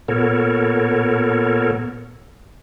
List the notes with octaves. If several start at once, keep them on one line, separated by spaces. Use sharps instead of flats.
A#2 B3 A4 A#4 C#5